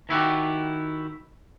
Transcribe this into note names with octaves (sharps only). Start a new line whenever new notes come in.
D#3 E4 F#4 G4